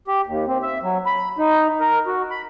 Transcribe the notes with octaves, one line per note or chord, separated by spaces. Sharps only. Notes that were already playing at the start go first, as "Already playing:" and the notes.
G4
D#2
C4
E5
F#3
B5
D#4
A#4
F#4
B5